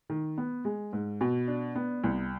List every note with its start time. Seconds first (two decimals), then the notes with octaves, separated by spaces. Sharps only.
0.10 D#3
0.38 B3
0.65 G#3
0.93 G#2
1.21 B2
1.48 D4
1.76 B3
2.04 C2